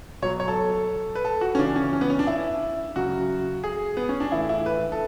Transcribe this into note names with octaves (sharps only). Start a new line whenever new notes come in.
B2 F#3 C#5
C#5
A4
B4
A4
F#4
C#4
C#3 E3 D4
C#4
C#4
B3
C#4
D4
E4
C#3 F#3 F#4
G#4
B3
C#4
D4
A2 E3 E4
E4
B4
A4